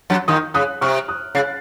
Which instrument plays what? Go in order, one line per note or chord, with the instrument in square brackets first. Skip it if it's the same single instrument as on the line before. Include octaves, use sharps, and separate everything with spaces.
[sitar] F#2 F#3
[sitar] D#2 D#3 [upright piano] C6 D#6
[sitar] C#3 [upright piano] D#6 F#6
[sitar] C3 [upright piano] C#6 F6
[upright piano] D#6 F#6
[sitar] C#3 [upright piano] A6 C7